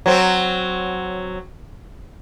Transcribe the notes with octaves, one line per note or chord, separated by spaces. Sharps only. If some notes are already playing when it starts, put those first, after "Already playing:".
F#3 C4